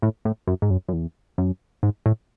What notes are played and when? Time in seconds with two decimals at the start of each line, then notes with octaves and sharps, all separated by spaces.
0.02 A2
0.25 A2
0.47 F#2
0.62 G#2
0.70 F#2
0.88 F#2
0.93 E2
1.38 F#2
1.83 G#2
2.06 A2